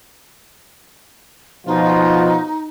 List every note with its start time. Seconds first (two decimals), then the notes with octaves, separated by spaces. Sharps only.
1.67 B2 F3 D#4 F4